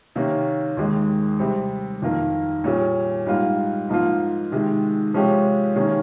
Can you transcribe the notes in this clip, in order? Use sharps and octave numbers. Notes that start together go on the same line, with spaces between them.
C3 D#3 A#3 C#4
D#2 D#3 G#3
C3 G3 C4
F2 D#3 A#3 F4 A#4
A#2 G3 C#4 G#4
G#2 G3 A#3 F4
G#2 F3 A#3 F4
C3 D#3 G#3
C3 F3 G#3 C#4 G4
C3 D#3 A#3 C#4 G#4